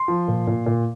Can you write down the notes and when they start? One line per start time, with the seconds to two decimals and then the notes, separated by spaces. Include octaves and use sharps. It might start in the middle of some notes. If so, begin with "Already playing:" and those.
Already playing: C6
0.08 F3
0.28 A#2
0.47 A#2
0.66 A#2